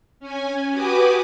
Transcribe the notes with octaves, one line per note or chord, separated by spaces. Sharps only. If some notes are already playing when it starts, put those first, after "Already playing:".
C#4 G#5
F#4 G4 B4 G#5 D6 D#6